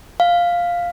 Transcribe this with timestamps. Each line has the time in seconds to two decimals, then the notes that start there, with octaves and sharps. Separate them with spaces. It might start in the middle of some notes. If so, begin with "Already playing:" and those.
0.20 F5